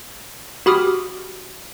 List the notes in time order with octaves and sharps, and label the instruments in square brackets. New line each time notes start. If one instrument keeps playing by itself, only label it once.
[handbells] F#4 G4 B5 D6 D#6 F6